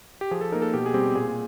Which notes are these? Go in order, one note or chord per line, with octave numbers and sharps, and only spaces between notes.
G4
F3 G#4
A4
A#3 D#4 A#4
A4
B2 G4
G#4
G3 C4 G4
A#2 G#4